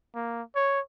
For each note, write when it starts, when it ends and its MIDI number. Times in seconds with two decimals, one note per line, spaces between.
0.15 0.42 58
0.55 0.80 73